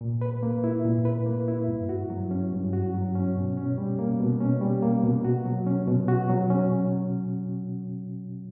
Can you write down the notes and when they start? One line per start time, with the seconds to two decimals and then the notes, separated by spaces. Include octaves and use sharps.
0.01 A#2
0.21 B4
0.43 A#3
0.64 E4
0.85 A#2
1.05 B4
1.26 A#3
1.48 E4
1.68 G2
1.89 F#4
2.10 F#3
2.31 C#4
2.52 G2
2.73 F#4
2.94 F#3
3.15 C#4
3.36 B2
3.57 C#4
3.78 G3
3.99 A#3
4.20 B2
4.40 C#4
4.61 G3
4.82 A#3
5.03 B2
5.24 F#4
5.45 F#3
5.67 C#4
5.88 B2
6.08 F#4
6.30 F#3
6.50 C#4